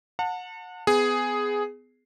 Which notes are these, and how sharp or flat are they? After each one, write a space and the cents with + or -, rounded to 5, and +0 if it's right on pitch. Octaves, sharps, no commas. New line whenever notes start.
F#5 -30 A5 +35
B3 +30 G#4 +0